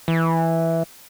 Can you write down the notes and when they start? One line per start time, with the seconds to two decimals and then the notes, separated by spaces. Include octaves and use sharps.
0.08 E3